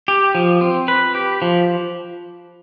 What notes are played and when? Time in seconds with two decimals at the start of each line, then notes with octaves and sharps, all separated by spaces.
0.08 G4
0.35 F3
0.61 C4
0.88 B4
1.15 G4
1.42 F3